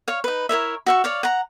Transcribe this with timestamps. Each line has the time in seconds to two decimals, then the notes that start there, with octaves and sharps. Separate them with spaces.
0.08 C#5 F5
0.24 D#4 B4
0.49 E4 A#4 C#5 E5
0.86 F#4 E5 C#6
1.04 C#5 D5 F5
1.23 F#5 A#5